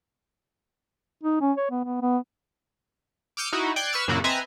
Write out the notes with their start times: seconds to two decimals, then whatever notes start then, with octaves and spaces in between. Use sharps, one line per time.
1.23 D#4
1.41 C#4
1.57 C#5
1.71 B3
1.85 B3
2.02 B3
3.37 D6 E6 F6 G6 C#7 D#7
3.53 D#4 E4 F#4
3.76 D5 G5 F#6 G#6 C7
3.93 B4 C#6 E6 F6
4.08 F#2 A#2 C#3 A#3 E4 F#4
4.24 C4 B4 D#5 E5 G#5 A#5